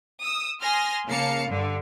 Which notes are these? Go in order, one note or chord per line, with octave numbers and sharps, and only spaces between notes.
D#6 E6
G#5 C6 D#6 F6 A#6
C#3 A#3 F5 A5 C#7
G2 D3